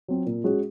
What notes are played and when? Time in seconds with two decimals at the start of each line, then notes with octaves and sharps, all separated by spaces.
0.08 F#3 C4
0.26 A#2
0.44 G#3 C#4 F#4